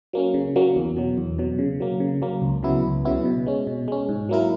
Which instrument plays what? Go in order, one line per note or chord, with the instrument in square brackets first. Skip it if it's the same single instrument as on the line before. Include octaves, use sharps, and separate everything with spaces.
[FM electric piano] F#3 A#3 C#4
C#3
F#3 A#3 C#4
E2
B2 F#3
E2
B2 F#3
C#3
F#3 A#3
C#3
F#3 A#3
C#2
C#3 F#3 B3 E4
C#2
C#3 F#3 B3 E4
B2
G#3 C#4
B2
G#3 C#4
G#2
F#3 A#3 E4 A#4